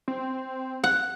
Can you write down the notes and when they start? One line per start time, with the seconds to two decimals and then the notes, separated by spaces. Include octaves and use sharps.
0.08 C4
0.84 F#5